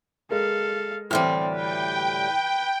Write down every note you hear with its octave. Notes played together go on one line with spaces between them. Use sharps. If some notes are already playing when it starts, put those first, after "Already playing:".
G#3 A4 A#4 F5
D2 A2 E3 G3 C4 F6
B4 G5